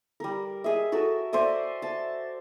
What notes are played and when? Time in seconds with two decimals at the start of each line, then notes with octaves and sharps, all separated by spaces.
0.20 G3 A#4
0.64 G#4 D#5 E5
0.92 F#4 A4 A#4 E6
1.33 C5 D5 E5 G#5
1.82 A5